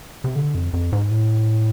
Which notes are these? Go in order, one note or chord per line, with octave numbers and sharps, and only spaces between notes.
C3
D3
F2
F2
G#2
A2